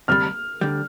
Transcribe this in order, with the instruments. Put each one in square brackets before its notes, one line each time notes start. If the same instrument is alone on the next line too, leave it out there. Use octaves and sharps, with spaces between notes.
[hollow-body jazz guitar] D2 C3 G3 [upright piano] F6
[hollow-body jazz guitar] D2 D3 G3